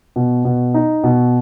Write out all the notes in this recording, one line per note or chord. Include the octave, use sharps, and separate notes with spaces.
B2
B2
D#4
B2